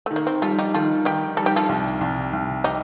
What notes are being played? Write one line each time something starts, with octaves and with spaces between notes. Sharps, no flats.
D#3 A3
A#3
C4
G3 F4 A4
D#4 G4
D#3 F4 A4
D#3 D#4 G4
G3 A4
G4
F4 A4
C2
C2
C2
D#4 G4